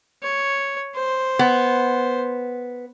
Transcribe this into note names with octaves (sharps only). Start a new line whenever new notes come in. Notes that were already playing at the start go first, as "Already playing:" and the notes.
C#5
C5
B3